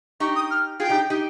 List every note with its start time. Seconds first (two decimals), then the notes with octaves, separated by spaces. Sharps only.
0.20 D#4 G4 C#6
0.36 D#6
0.51 F6
0.80 F4 G#4 G5
0.89 D#4 G4
1.10 D#4 G4